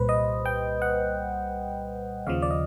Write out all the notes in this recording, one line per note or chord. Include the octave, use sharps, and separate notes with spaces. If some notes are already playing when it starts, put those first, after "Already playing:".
Already playing: C2 A#2 G3 B4 C5
D#5
G5
F#5
D#2 C#3 F3 F5
D5
D#5